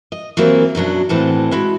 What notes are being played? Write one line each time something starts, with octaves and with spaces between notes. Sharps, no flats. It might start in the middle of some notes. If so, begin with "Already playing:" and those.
D#5
E3 F#3 G3 A#3 C4
F#2 B2 F#3 D4
D2 A2 E3 C4 F#5 A5
G#3 E4 F#4